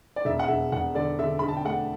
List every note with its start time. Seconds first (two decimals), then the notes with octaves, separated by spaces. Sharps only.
0.16 D5
0.25 E1 E5
0.39 F#5
0.48 E1 E5
0.72 E1 F#5
0.95 D3 D5
1.19 D3 E5
1.39 D3 B5
1.48 A5
1.57 G5
1.65 A3 F#5